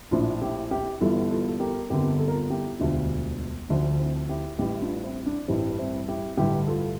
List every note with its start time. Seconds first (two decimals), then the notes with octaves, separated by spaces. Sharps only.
0.11 A#1 A2 F3 D4 F4
0.42 E4 G4
0.71 E4 G4
1.01 G1 G2 E3 G3 F4 A4
1.31 F4 A4
1.48 A4
1.60 G4 A#4
1.90 G1 F2 D3 G3 G4 A#4
2.20 A4
2.28 A#4
2.35 F4 A4
2.50 E4 G4
2.79 E1 D2 D3 G3 D4 F4
3.69 D2 D3 F3 D4
4.00 C4 E4
4.29 E4 G4
4.59 A1 A2 E3 G3 E4 G4
4.81 D4 F4
5.04 C4 E4
5.26 D4
5.48 A1 G2 E3 G3 C4
5.78 C4 E4
6.08 E4 G4
6.37 A1 G2 D3 G3 E4 G4
6.67 F4 A4